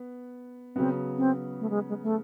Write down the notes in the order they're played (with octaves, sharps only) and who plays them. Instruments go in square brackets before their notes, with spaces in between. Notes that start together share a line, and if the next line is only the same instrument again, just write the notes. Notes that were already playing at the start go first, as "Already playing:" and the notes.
Already playing: [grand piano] B3
[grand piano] C#3 F#3 B3 [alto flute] C4
[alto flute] C4
A3
G#3
G#3
A3